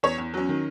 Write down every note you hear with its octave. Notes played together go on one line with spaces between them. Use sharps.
E2 C#5
E2
F#3 C#4
D#3